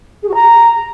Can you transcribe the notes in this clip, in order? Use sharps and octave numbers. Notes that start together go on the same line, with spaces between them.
G#4
F#4
A#5